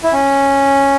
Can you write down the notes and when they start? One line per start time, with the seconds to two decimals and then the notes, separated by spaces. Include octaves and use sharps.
0.04 E4
0.12 C#4